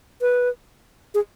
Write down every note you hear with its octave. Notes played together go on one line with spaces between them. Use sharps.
B4
G#4